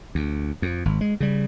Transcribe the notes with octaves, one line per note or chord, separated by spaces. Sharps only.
D2
F2
G#1
G#3
C#3 G3